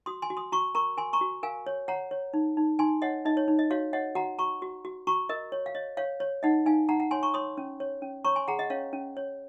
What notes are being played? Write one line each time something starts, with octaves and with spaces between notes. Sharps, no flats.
F#4 C6 D#6
G#5 C6
F#4
C6 D#6
F#4 A#5 C#6
A#4 A#5 C#6
A#4 G#5 C6
A#5 C#6
F#4
A#4 F5 G#5
C#5
C#5 F#5 A#5
C#5
D#4
D#4
D#4 G#5 C6
C#5 D#5 F#5
D#4 D#5
C#5
D#4
D#5
F#4 C#5 F5
C#5 D#5 F#5
F#4 F#5 A#5
F#4 A#5 C#6
F#4
F#4
F#4 A#5 C#6
A#4 D#5
C#5
F5
C#5 D#5
C#5 F5
C#5
D#4 D#5 F#5
D#4 F5 G#5
D#4 F#5 A#5
F#5 A#5
C#5 G#5 C6
A#5 C#6
C#5 C6 D#6
C#4
C#5
C#4
C#5 A#5 C#6
G#5 C6
G#4 F#5 A#5
D#5 F#5
C#4 C#5 F5
C#4
C#5